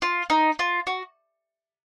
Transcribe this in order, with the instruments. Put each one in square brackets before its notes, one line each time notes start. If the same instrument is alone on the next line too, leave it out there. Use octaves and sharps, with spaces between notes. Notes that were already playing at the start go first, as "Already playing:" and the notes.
[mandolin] F4
D#4
F4
F#4